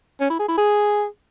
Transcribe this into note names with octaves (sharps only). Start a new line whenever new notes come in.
C#4
E4
G#4
E4
G#4